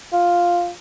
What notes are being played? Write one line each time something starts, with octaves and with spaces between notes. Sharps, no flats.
F4